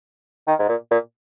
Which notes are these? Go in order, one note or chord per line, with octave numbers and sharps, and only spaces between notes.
D#3
G#2
A#2
A#2